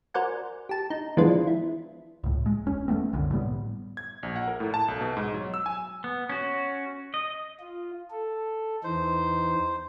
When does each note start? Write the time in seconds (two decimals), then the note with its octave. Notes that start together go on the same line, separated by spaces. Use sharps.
0.14 F#4 A#4 C5 D5 F#5 G#5
0.69 G4 A5
0.90 D#4
1.17 E3 F3 G#3 B3 D4 F4
1.47 E4
2.24 C#2 A2
2.46 G#3
2.66 E1 C#4
2.88 G3 A3 B3 C4
3.12 G1 C2 F#2 D3
3.32 A2 G3 B3
3.97 G#6
4.23 A#1
4.36 F#5
4.48 A#4
4.60 A2
4.74 A5
4.88 B1
5.01 B2
5.17 G#2
5.34 F#3
5.54 E6
5.66 G#5
6.04 B3
6.29 C#4 F#4
7.14 D#5
7.60 F4
8.11 A4
8.84 E2 E3 D#4 C5